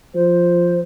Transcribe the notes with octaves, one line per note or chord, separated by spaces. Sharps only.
F3 C5